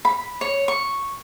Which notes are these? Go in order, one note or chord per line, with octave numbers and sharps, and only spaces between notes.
B5
C#5
C#6